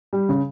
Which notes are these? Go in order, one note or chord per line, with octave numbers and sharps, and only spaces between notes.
G3
C#3